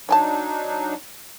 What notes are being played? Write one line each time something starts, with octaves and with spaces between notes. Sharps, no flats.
F#3 D4 D#4 C#5 G#5 A5